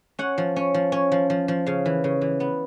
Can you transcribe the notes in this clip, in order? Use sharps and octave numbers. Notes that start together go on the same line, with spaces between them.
C#4 F#5
F3
C#4
F3
C#4
F3
F3
F3
C#3 F5
E3
C#3
E3
B3